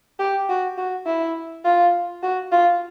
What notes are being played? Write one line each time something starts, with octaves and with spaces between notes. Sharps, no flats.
G4
F#4
F#4
E4
F4
F#4
F4